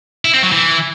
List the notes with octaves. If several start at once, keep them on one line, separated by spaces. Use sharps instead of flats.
E4
C4
F#3
E3